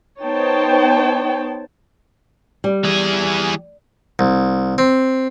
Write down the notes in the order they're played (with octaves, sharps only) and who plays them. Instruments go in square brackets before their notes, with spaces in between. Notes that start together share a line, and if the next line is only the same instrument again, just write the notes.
[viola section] B3 D#4 C5 C#5 G5 A5
[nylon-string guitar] G3
[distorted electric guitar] E3 G#4
[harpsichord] C2
C4